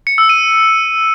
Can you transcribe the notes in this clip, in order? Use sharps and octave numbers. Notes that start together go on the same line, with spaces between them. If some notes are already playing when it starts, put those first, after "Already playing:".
C#7
E6
D#7